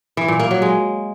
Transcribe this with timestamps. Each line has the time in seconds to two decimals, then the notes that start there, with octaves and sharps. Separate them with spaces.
0.17 E3
0.28 A#2
0.40 A#3
0.51 F#3
0.62 G#3